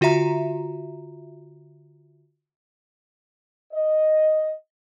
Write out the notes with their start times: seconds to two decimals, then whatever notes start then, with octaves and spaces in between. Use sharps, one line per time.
0.01 D3 F4 F#4 E5 A#5
3.73 D#5